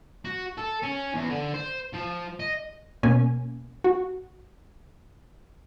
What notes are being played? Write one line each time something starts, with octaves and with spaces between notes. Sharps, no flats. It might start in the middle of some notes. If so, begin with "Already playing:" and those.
F#4
A4
C#4
E2
D3
C5
F3
D#5
B2 A#3 C#4 G#5
F#4